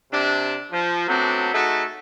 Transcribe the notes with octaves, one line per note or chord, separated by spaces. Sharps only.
C3 D4
F3
F#3 A3 B3 C4 D4
A3 D#4 F#4 G#4 A4